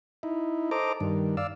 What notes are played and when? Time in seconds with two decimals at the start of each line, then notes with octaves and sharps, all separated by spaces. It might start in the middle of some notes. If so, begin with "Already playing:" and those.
0.23 D#4 E4
0.71 A4 C5 D#5 A#5 D6
1.00 G2 D#3
1.37 D5 F5 E6